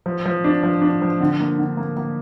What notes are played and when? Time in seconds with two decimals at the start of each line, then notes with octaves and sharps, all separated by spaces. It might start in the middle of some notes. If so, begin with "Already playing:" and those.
0.06 F3
0.26 F3
0.44 D4
0.63 F3
0.82 D4
1.02 F3
1.20 D3
1.40 A#3
1.59 D3
1.77 A#3
1.97 A#3